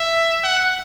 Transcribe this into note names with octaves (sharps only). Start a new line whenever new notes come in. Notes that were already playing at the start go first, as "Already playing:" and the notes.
Already playing: E5
F#5